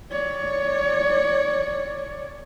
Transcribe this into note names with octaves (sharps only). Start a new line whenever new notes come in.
C#5 D5